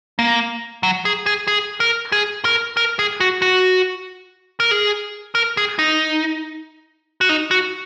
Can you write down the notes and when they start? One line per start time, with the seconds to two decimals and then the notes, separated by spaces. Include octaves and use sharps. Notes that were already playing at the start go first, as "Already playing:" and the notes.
0.19 A#3
0.83 F#3
1.05 G#4
1.26 G#4
1.48 G#4
1.80 A#4
2.12 G#4
2.45 A#4
2.77 A#4
2.99 G#4
3.20 F#4
3.42 F#4
4.60 A#4
4.71 G#4
5.35 A#4
5.57 G#4
5.79 D#4
7.21 F#4
7.29 D#4
7.51 F#4